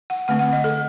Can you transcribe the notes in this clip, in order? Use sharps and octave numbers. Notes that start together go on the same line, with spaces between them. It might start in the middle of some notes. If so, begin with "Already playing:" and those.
F#5
D3 A3 C4 F#5
F#5
D#5
A4